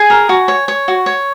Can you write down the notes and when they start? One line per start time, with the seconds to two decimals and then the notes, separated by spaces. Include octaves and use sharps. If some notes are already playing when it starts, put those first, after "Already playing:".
Already playing: G#4 G#5
0.10 A#4
0.29 F#4
0.48 C#5
0.68 C#5
0.88 F#4
1.06 C#5